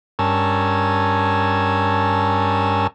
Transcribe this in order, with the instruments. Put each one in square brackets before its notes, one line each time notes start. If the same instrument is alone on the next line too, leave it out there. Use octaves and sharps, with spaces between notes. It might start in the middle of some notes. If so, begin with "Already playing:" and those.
[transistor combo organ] G2 C#4 A#4 G#5 A5 E6